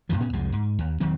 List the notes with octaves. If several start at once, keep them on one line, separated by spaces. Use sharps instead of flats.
F#2 A#2 D3 F3
A2 B3 C#4
C2 F2 F3 G#3
G#2
D#2
E1 D#3 F#3 C4